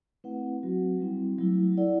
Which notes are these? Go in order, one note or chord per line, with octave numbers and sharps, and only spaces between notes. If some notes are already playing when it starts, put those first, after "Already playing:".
A3 C4 E4 B4 F#5
F#3 C4 F#4
G3 C4 E4
F#3 A3 E4
E4 A4 D5 F#5